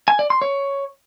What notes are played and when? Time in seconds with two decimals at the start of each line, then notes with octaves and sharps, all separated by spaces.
0.08 G#5
0.19 D5
0.30 C6
0.42 C#5